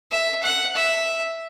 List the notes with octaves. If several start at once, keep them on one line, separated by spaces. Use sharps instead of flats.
E5
F#5
E5